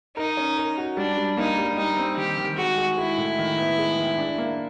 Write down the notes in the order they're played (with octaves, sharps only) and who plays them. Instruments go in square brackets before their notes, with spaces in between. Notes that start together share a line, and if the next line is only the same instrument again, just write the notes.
[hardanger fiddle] D#4 [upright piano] A#4
[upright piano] C#4
A#4
F#4
[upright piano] G3 [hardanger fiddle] D4
[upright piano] G3
[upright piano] A#3 [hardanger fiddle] D#4
[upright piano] G3
[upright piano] G3 [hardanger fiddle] D#4
[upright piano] C4
[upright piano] D#3 [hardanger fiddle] G4
[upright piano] D#3
[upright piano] G#3 [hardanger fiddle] F#4
[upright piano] G#3
[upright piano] G#3 [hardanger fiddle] E4
[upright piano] A2
D#3
B3
G#3
D#3
D4
A#3